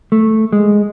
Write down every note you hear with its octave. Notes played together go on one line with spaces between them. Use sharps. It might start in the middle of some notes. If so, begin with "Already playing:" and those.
A3
G#3